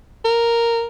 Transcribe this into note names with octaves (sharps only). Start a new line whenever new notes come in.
A#4